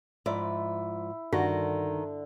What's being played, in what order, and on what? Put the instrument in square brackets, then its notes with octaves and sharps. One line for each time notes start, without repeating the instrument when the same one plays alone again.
[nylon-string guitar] G#2 F3 D5 [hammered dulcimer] E4
[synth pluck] G2 F#4 A#6 [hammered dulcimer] D3 [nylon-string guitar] D#3